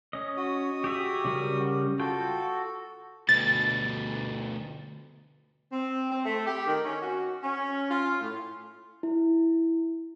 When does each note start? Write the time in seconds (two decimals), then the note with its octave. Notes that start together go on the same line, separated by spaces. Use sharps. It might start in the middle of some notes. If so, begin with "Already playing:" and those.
0.13 C#4 D#5
0.37 F#4 D#6
0.84 G4 G#4 E5
1.25 C#3 G3 A#4
1.99 F4 F#4 A4 G5
3.29 D2 B2 A6
5.72 C4
6.11 C4
6.25 A3
6.46 G4
6.66 D#3
6.85 C#4
7.01 F#4
7.43 C#4
7.90 F4
8.19 A2
9.03 E4